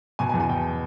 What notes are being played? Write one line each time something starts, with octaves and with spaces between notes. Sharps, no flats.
B2 G#5
G#5
E2
G#5
B2 G5